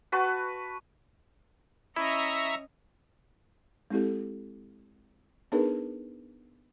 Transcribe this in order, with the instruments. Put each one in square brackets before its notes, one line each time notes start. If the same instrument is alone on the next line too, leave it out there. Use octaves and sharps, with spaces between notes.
[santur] F#4 B4 A5 C#6
[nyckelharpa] C#4 D#5 [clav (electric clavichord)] E4 [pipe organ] E5 A#5 C#6
[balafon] G#3 C4 E4 G4 A4
B3 D4 D#4 G#4 A#4 B4